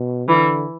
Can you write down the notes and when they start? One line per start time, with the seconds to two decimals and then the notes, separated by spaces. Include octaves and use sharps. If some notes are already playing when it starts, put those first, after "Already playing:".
Already playing: B2
0.27 D3 E3